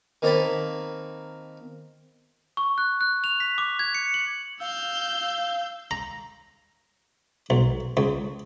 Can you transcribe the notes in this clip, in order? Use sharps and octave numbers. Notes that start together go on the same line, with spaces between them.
D#3 A#3 C4 G#5 A5 B5
C#6
F#6
F#6
F7
B6
D6
G#6
C#7
F#7
F5 E6 G6
A#5
B1
C#2